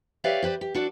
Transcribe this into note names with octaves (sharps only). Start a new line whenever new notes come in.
G4 B4 C#5 D5 E5 F5
G4 B4 C5 D5
G4
D4 F#4 A4 D5